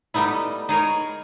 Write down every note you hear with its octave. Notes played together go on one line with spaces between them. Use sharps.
G3 A3 B3 D#4 E4
D#4 G#4 A#4 C#5